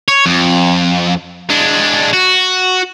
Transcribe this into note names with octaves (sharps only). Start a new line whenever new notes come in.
C#5
F2
G#3 D4
F#4